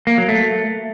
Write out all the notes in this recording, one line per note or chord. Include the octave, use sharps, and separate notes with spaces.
A#3
F#3
A3